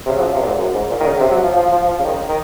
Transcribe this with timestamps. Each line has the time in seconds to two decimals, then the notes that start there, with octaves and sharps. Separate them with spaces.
0.05 C3
0.09 C#3
0.18 F#3
0.22 F3
0.34 C3
0.41 A#2
0.46 G#2
0.58 F#2
0.74 G#2
0.90 A#2
1.00 D#3
1.07 C#3
1.20 C3
1.31 F#3
1.43 F3
1.56 F3
1.72 F3
1.88 F3
1.99 C#3
2.05 D#3
2.29 D#3